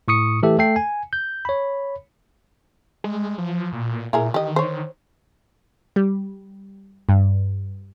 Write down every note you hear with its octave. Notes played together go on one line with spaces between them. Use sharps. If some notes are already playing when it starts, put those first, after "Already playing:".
A2 C#6 D#6 C#7
E3 A3 G4 A4 E5
A3 A4 G5 C7
G#5
G6
C#5 B5
G#3
F3
A#2
A#2 E4 G#4 A#4
D#3 G4 D#5
C5 C#5
G3
G2